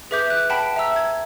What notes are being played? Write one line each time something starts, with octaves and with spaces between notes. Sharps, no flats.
G#4 B4 E5 D6 G6 B6
F#6
F#5 G5 A5 B5 B6 D7
E5 A#5 E6
G#6